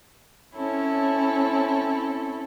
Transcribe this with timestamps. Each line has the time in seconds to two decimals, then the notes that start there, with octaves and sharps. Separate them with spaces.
0.56 C4 C#4 E4 A4 C#5